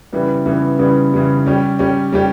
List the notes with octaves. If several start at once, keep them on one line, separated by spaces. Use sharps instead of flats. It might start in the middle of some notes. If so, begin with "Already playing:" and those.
C#3 E3 G3 B3
C#3 E3 G3 B3
C#3 E3 G3 B3
C#3 E3 G3 B3
G3 C#4 G4
G3 C#4 G4
G3 C#4 G4